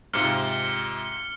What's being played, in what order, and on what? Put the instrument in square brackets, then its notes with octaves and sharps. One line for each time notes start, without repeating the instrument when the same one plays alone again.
[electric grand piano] G#2 C3 F4 [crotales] F6 C#7 G7